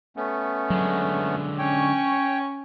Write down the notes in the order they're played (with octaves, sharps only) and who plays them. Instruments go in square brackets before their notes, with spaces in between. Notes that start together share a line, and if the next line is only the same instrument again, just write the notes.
[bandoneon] A3 B3 C#4
[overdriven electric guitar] D3 G#3 [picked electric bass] F#3
[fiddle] C#4 C#6 [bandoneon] C#5 G5